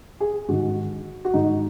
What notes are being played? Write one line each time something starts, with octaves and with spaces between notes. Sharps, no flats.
G#4
G#2 D#3 F#4
F#4
G#2 D#3 D#4